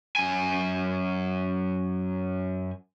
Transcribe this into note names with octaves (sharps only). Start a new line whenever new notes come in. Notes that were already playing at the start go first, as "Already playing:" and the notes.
F#2 G#5